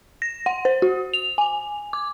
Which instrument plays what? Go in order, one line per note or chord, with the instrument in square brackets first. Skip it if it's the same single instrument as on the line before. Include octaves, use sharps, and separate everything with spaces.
[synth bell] A#6
F#5
C5
F#4
F7
G#5
D6